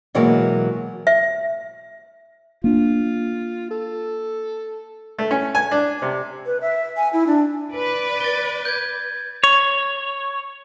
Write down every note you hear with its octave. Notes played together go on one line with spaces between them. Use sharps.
B2 E3 F#3 G#3 A#3 B3
E5
A#3 D4 F4
A4
A3
C#4
G#5
D4
C3
B4
E5
G#5
E4
D4
B4 D5
A6 G7
G6 G#6
C#5